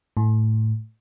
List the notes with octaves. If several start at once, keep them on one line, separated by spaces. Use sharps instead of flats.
A2